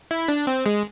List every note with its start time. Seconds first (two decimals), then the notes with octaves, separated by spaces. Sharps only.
0.11 E4
0.28 D4
0.47 C4
0.66 G#3